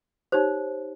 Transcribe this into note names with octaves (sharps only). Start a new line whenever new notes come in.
D#4 G4 C5 C#5